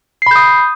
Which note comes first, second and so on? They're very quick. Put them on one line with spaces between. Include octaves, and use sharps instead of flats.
C7 B5 G6 D#6